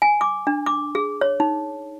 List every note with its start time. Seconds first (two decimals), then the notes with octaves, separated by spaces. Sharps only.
0.02 G#5
0.21 D6
0.47 D4
0.66 D6
0.95 G#4
1.21 C#5
1.40 D#4